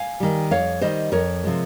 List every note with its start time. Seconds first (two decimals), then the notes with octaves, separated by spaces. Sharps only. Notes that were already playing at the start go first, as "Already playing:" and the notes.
Already playing: F5 G#5
0.20 D#3 G3
0.51 F2 C#5 F5
0.81 D#3 G3 C5 D#5
1.12 F2 A#4 C#5
1.44 C3 F3 G#3